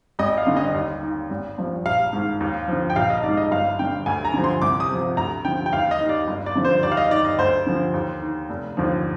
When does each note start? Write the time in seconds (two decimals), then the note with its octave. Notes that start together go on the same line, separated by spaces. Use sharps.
0.19 G#1 D#5
0.38 F5
0.47 G2 D3
0.57 D#5
0.74 D#2
1.02 D#3
1.30 G#1
1.58 G2 F3
1.85 A#1 F5
2.13 G#2 D#3
2.40 D#2
2.68 D3 F3
2.90 G5
2.96 A#1 F5
3.10 D#5
3.23 G#2 D#3 D5
3.37 D#5
3.51 G1 F5
3.79 G2 D3 G5
4.06 D2 G#5
4.25 A#5
4.34 D3 F3
4.44 C6
4.62 C2 D6
4.80 D#6
4.89 C3 F3
5.17 D2 A#5
5.45 D3 F3 G5
5.66 G5
5.73 D#2 F5
5.91 D#5
6.00 D#3
6.09 D5
6.28 G1
6.46 D5
6.56 G2 D3 F3
6.65 C5
6.83 D#2 D5
6.92 F5
6.97 D#5
7.10 D#3 D5
7.25 D#5
7.38 D2 C5
7.66 D3 F3
7.94 D#2
8.21 D#3
8.50 F1
8.77 D#2 D3 F3